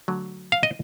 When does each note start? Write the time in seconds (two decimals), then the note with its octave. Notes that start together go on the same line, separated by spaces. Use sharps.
0.08 D3 F#3 A3
0.52 F5
0.63 D#5